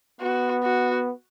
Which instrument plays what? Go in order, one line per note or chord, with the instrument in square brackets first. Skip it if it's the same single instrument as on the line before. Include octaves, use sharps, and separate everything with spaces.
[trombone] B3 [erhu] F#4
[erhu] F#4